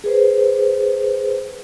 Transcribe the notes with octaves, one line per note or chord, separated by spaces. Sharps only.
G#4 B4 C5